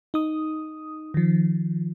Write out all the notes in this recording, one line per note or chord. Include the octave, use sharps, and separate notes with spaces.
D#4 D#6
D#3 F3